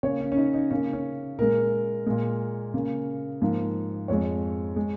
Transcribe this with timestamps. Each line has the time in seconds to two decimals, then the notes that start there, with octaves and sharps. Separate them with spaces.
0.03 C#3 A#3 C#5
0.20 C#4
0.32 C#4
0.37 D#4
0.54 D#4
0.71 C#3 A#3 C#4
0.93 C#4
1.38 A#2 G#3 A#4
2.06 A#2 G#3
2.74 C#3 A#3
3.41 G#2 F3 A#3
4.08 F2 F3 G#3 C#5
4.76 G#3